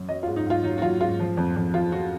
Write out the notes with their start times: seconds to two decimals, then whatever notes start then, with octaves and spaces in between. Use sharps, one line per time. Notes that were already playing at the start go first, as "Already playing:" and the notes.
Already playing: F#2
0.09 F#3 D#5
0.23 F4
0.27 G#2
0.36 D#4
0.46 G#2 F4
0.64 F#3 D#4
0.78 F#4
0.82 F#3 F4
1.00 G#2 F4
1.20 F3
1.37 F2
1.56 F2
1.74 F3 F4
1.92 F3 F#4